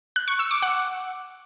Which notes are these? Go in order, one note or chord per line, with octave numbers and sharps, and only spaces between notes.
F#6
C#6
E6
D6
F#5